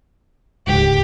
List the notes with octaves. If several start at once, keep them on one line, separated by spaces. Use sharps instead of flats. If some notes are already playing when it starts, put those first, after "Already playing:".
D1 C#2 G#2 G4